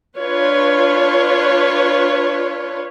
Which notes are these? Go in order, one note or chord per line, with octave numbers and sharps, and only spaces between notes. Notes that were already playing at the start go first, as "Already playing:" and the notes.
D4 F4 B4 C#5